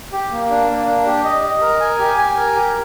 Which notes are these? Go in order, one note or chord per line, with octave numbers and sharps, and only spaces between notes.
G4
A#3
D4
A#3
D4
G4
D#5
D#5
A#4
G#5
G4
G#5
A#4
G4